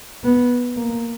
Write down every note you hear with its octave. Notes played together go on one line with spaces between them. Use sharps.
B3
A#3